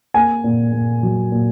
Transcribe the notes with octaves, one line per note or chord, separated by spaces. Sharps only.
A#3 G#5
A#2
A#2
F#3
A#2